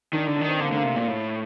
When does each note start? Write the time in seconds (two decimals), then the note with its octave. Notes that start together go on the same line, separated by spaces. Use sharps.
0.13 D#3 D4
0.26 D3 D#4
0.36 D4
0.41 D#3
0.48 C4
0.60 D3 A#3
0.68 A3
0.72 D3 A#3
0.83 C3
0.96 A#2
1.08 A2 A3